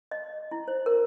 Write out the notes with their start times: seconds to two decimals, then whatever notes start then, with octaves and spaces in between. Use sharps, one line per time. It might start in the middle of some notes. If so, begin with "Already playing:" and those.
0.11 D#5
0.51 E4
0.68 C5
0.86 A#4